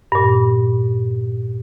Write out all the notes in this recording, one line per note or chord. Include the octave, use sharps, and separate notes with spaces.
G2 A#2